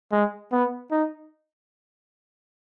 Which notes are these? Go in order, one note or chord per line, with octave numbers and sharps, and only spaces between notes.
G#3
B3
D#4